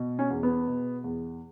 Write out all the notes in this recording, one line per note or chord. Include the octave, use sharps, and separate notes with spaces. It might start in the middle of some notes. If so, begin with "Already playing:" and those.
Already playing: B2
C#4
E2
B3
B2
E2